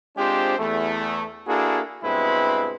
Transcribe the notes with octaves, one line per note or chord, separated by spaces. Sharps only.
G#3 C4 D4 F4 G4 C5
E2 A3
A#3 D4 E4 F#4 G#4 A4
G2 B2 G#3 C4 E4 B4